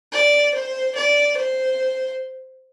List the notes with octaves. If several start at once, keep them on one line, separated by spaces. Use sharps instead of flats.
D5
C5
D5
C5